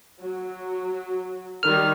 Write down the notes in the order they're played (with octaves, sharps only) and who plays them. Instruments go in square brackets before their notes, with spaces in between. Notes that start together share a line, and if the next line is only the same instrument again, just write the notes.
[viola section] F#3
[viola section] D#3 G3 [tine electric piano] F6